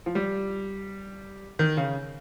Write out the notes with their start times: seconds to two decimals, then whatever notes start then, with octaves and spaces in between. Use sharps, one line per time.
0.06 F3
0.15 G3
1.59 D#3
1.77 C#3